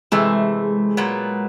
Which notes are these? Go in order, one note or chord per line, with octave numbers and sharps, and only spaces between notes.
C3 E3 G#3 A3
A#2 F#3 B3